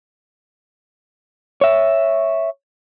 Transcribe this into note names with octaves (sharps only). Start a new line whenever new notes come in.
C#5 E5